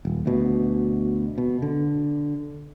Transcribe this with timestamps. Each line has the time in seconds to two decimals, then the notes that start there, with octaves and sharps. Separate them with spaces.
0.05 D#1
0.26 D2 B2
1.38 B2
1.62 D3